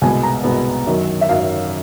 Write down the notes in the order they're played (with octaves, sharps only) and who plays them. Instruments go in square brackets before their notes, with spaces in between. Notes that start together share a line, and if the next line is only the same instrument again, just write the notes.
[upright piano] C2 B2 G#3 B3 G#5
A#5
C2 B2 G#3 B3
F#2 D#3 F#3
E5
F#2 D#3 F#3 F5